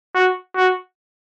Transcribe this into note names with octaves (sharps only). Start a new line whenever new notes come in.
F#4
F#4